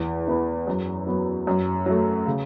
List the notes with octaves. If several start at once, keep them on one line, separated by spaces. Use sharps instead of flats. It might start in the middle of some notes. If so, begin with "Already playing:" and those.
Already playing: E2
E3 B3 E4
F#2
F#3 B3
F#2
F#3 A3
C#3